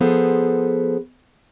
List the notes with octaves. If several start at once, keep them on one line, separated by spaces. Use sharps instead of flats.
F3 B3 G#4 A4 C5